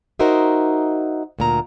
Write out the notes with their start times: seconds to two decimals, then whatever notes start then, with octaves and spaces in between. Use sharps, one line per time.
0.19 D#4 F#4 A#4 C5 D#5 E5
1.39 D2 A#2 A#5